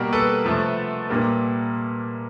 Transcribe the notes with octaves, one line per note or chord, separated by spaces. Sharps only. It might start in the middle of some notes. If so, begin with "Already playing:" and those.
Already playing: B2 G3 A#3 A#4
A4 B4
C3 F3 A3
A#2 G3 A#3